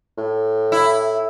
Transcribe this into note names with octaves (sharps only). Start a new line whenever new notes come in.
A2
E4